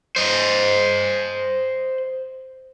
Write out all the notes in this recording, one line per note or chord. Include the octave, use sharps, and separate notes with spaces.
C5 D#5